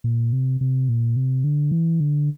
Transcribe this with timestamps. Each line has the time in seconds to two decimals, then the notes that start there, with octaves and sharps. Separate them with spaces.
0.04 A#2
0.33 C3
0.61 C3
0.89 A#2
1.16 C3
1.44 D3
1.72 E3
2.00 D3